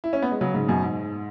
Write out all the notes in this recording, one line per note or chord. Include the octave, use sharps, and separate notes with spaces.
E4
C#4
B3
G#3
C#3 F#3
G#2 C#3
F#2 B2
G#2